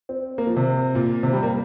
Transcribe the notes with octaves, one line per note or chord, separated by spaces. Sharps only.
C4
A#3
F3
C3
A#2
C3
G3
A#3